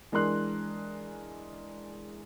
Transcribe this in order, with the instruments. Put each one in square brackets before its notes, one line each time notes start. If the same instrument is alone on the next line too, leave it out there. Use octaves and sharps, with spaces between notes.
[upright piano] E3 G#3 D4 A#4 C6 F#6